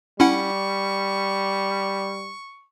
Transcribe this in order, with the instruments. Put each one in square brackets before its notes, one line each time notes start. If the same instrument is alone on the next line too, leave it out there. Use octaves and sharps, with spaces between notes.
[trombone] G3 [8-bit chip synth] C#4 E4 F#5 [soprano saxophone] C#6